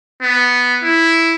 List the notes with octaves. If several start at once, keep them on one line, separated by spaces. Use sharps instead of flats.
B3
E4